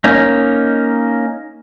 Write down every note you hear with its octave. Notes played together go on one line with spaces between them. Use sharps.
A#3 C#4 D#4